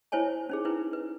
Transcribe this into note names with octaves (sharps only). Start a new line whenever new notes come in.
E4 C5 C#5 G#5 A5
C#4 D#4 G#4
D#4 E4 B4
B4